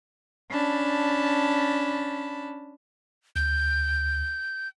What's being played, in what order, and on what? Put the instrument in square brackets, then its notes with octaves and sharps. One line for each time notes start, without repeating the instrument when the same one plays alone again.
[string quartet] C#4 D4 A5 B5
[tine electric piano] D2 [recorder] G6